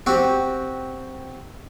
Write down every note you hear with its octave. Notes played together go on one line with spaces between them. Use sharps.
C4 F#4 G4